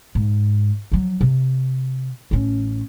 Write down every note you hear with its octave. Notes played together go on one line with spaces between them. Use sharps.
G#2
F3 F#3
C3
A1 C#4